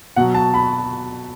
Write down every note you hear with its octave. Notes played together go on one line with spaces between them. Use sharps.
B2 F#3 F#5
A5
B5